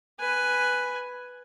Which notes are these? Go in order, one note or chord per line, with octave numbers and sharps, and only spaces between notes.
B4 G#5